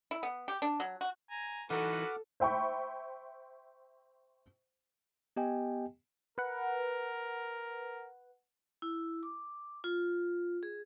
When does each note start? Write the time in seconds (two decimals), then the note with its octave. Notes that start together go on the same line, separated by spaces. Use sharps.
0.11 E4
0.23 B3
0.48 G4
0.62 D4
0.80 F#3
1.01 F#4
1.31 G#5 A#5
1.70 E3 D#4 F#4 A4 B4 F#5 D6 F6
2.40 C5 E5 G5 B5 C#6
5.37 B3 G4 D#5 G5 G#5
6.38 A#4 B4 F#5
8.82 E4
9.23 D6
9.84 F4
10.63 G#4